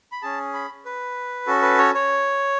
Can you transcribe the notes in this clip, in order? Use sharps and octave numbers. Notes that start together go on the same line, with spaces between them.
B5
C#4 G#4 A5
B5
B4
C#4 F#4 A4
B4
C#5
C#5